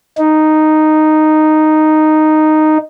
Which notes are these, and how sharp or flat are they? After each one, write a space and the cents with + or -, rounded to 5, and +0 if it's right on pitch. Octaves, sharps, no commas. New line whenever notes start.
D#4 -5